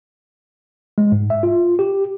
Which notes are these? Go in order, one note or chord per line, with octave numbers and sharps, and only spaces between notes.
G#3
G#2
E5
F4
G4